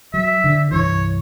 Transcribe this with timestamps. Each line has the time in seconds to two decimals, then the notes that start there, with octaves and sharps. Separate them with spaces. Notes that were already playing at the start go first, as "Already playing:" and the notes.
0.14 F#3 E5
0.44 D3
0.71 C2 G2 E3 C#5